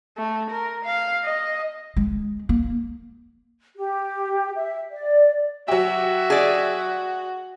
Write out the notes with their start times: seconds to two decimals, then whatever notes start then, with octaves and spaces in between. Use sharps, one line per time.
0.17 A3
0.50 A#4
0.84 F5
1.25 D#5
1.96 G#3
2.49 A#3
3.76 G4
4.55 E5
4.91 D5
5.68 F#3 F#4 G4 E5
6.30 G#4 D5